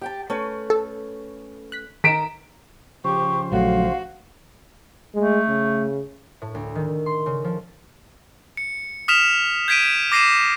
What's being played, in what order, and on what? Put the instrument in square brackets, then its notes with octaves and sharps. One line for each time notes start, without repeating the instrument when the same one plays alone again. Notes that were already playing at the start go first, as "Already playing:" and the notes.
[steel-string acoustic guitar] G4 G5 A5
A3 C#4 B4
[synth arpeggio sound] A4
F#6 B6
[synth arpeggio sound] D#3 [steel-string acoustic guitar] D#4 A#4 [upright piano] B6 D7 E7
[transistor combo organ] C#3 F3 C5 [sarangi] G4 [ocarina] C#6
[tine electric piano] A#1 F#3 A3 [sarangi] F#4 [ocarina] F5
[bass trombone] G#3 [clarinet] A3
[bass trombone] C#3
[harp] A2
D2
D#3
C6
C#3
F3
[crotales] C#7
D#6 F6 B6 E7 F7
G6 G#6 B6 D7 D#7
D6 A#6 C7 D#7 E7